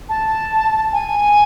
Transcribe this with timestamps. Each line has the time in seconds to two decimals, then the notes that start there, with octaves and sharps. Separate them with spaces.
0.09 A5
0.92 G#5